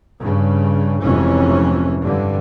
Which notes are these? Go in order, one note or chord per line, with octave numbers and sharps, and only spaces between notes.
G2 C#3
F1 F2 G#2 E3 C#4
G2 D3